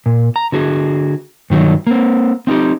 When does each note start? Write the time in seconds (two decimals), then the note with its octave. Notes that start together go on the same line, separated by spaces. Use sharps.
0.06 A#2
0.36 A#5
0.52 D3 F#4 G#4
1.50 G2 D#3 F#3
1.87 A#3 C4
2.47 C4 D#4 F#4 G4